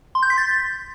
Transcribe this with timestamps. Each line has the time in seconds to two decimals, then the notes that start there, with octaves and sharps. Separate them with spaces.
0.15 C6
0.23 G6
0.30 B6
0.38 A6